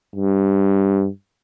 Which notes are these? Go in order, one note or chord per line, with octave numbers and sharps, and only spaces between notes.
G2